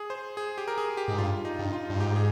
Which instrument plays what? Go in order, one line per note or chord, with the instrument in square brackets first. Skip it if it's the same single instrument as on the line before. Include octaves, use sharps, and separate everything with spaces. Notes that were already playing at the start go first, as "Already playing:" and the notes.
Already playing: [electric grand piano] G#4
C5
G#4
G4
A#4
G#4
G4
[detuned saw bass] G#2
[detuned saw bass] G2 [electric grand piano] F4
[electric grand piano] D#4
[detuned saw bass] G2
[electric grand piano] F4
[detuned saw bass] G2
[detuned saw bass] G#2 [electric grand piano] G4
[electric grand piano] G#4